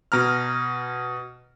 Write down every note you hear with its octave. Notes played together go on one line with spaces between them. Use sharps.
B2 A#5 F6